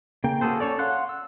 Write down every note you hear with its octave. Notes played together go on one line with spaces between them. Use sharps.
C#3 A#3 G5
A#3 F#4 G#4 A4 C5
C#4 A4 C#5 D5
F5 F#5 C6 F#6
E6